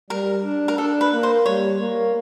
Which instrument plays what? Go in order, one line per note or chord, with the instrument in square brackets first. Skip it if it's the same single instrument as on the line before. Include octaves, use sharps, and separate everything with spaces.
[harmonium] G3 [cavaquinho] A#4
[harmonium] D4
[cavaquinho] A#4
[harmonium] D4 [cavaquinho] A4
[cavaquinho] B4
[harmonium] A#3
[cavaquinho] C5
[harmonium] G3 [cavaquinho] C#5
[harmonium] A#3